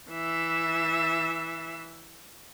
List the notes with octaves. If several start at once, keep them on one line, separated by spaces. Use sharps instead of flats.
E3 E5